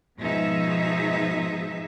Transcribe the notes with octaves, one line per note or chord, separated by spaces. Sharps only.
G#2 B2 F3 D#4 G#4 E5